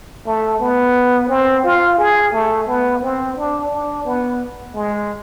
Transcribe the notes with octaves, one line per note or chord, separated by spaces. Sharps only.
A3
B3
C4
F4
G#4
A3
B3
C4
D4
D4
B3
G#3